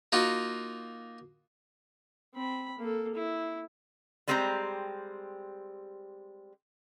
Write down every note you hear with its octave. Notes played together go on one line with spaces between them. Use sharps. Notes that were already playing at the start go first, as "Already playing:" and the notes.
A#3 D#4 F4 F#4
C4 B5
A#3 A4
E4
G3 G#3 C4 G4 A#4 A#5